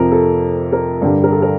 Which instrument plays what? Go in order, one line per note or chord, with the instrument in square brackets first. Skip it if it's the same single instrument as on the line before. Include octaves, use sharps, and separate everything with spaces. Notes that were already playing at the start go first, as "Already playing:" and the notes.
Already playing: [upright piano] F2 C3 F3 A#4
A4
A#4
G2 D3 G3
A#4
A4
A#4